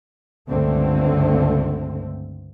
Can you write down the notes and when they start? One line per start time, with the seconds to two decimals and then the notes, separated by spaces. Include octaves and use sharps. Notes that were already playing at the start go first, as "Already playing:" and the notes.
0.49 C#2 G2 D3 A3 C4